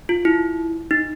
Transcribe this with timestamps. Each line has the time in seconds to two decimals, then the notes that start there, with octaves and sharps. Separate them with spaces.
0.09 F4
0.25 E4
0.91 D#4